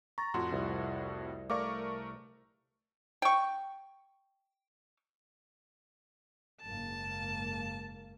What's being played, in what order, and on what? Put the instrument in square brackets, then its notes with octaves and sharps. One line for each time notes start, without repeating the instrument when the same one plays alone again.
[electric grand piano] A#5 [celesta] C#6 A6 A#6
[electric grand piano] F2 A2 F#4 [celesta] F4 C6
[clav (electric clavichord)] C2
[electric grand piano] A3 A#4 C#6 [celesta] D5 F5 D6
[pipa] G5 C#6
[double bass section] F#1 G#2 A#3 [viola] A5